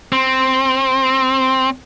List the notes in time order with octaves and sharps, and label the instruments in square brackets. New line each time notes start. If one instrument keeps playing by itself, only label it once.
[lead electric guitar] C4